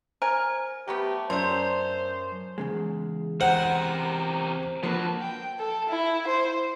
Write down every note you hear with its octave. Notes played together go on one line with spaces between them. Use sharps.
A#4 C5 G#5
F#3 A3 B3 G4
F#2 C5 D5 C6
E2 C#3 G#3
C3 A#4 C5 F#5
D3 F3 A#3 F#4 B4 A5
G5
A4
E4
C5